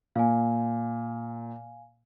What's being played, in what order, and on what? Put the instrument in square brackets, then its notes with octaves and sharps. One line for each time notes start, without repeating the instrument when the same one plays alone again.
[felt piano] A#2 [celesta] F5 G#5